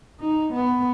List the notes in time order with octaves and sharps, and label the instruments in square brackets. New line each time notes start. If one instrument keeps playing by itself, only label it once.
[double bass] D#4
B3